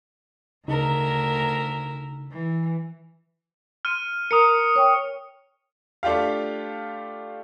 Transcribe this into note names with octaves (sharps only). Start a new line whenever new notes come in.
D2 C#3 D#4 A#4 E5
E3
C6 F6 D#7
A#4 A#5 D#6 C#7
C#5 G5 C#6
A3 D4 F4 G4 F5